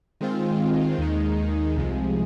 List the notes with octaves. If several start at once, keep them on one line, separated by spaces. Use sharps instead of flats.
D#3 G#3 C4 F4
D#2 D#3 G#3 D#4
C2 C3 F3 G#3